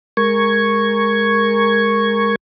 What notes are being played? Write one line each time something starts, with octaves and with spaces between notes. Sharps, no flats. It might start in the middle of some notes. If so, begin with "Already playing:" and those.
G#3 A#4 C#6 G#6